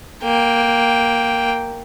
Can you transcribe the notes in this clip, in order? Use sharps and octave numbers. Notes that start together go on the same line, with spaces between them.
A#3 G5